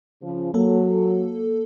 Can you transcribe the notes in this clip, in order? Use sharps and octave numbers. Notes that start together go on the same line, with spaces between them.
C#3 F3
F#3 A#3 A4